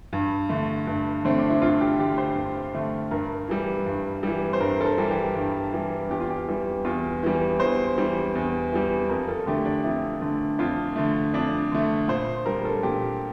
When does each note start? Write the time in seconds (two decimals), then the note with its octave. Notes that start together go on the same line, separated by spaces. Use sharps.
0.13 G2
0.49 D3 A3
0.87 G2
1.24 D3 A3 C4
1.38 D4
1.50 E4
1.61 G2 F4
1.81 G4
1.99 D3 A3 G4
2.18 C5
2.36 G2
2.74 D3 A3
3.11 G2 A#4
3.48 E3 G3
3.86 G2
4.23 E3 G3
4.53 C5
4.61 G2 A#4
4.81 A4
4.85 A#4
4.98 E3 G3
5.11 G4
5.35 G2
5.73 E3 G3
6.10 E2 G4
6.20 F4
6.31 G4
6.48 E3 G3
6.84 E2 F4
7.23 E3 G3
7.60 E2 C5
7.98 E3 G3
8.35 E2
8.72 E3 G3
9.09 F2 A#4
9.29 A4
9.46 D3 A3 G4
9.65 D4
9.84 F2 E4
10.21 D3 A3
10.59 F2 F4
10.96 D3 A3
11.34 F2 D4
11.71 D3 A3
12.08 A#2 C5
12.46 G3 A#4
12.65 A4
12.83 A#2 G4